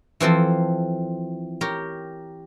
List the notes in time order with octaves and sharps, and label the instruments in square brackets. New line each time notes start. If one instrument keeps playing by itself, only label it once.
[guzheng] E3 F3 C4 A4
G4 A#4 C#5